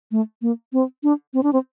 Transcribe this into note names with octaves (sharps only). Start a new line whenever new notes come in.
A3
A#3
C4
D4
C4
D4
C4